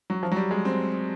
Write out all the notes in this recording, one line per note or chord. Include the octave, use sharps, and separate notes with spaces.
F#3
F3
F#3
G3
G#3
C4